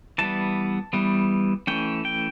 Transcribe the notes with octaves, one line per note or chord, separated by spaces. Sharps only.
E3 G3 B3 A5
E3 G3 B3
E3 A3 C#4 G5
G5